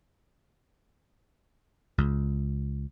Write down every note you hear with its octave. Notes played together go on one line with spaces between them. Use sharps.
C#2